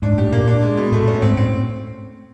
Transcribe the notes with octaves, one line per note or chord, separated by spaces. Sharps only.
G#2 D4
A2 G4
A#2 A#3
D4
G#3
B2
A2 A3
C#4
G#2 C4
A2 C4